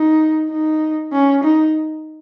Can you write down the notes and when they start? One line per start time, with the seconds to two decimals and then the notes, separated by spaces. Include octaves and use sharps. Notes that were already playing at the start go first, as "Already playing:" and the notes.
Already playing: D#4
0.50 D#4
1.13 C#4
1.44 D#4